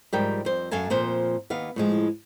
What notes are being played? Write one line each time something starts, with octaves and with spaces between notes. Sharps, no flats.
G#2 F3 G3 A#4 G5
F2 C5
F#2 A4 F5 G#5 A5
F2 A#2 F3 C5
D#2 B3 F5
A2 F3 G#3